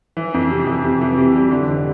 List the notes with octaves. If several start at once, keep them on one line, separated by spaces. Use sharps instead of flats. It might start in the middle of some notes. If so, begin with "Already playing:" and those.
E3
F2
C3
F2
C3
E3
C3
G3
D3
F1